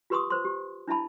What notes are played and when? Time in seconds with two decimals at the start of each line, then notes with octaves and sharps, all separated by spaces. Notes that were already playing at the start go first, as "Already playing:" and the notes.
0.10 F4 G4 B4 C6 C#6 D#6
0.30 B4 C5 C6
0.45 G4
0.88 D4 E4 E5 A5 B5